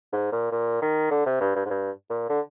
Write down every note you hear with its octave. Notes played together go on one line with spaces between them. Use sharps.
G#2
A#2
A#2
D#3
D3
C3
G2
G2
G#2
G2
A#2
D3